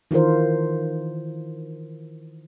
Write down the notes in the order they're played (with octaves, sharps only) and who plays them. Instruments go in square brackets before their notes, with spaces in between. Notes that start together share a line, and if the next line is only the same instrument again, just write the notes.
[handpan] D#3 E3 F4 A#4 C5